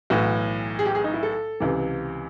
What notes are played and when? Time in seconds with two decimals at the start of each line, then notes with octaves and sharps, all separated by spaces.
0.10 B1 A2 E3 F#4
0.79 G#4
0.86 G4
0.95 G#4
1.04 D#4
1.14 E4
1.23 A4
1.60 C#2 C3 E3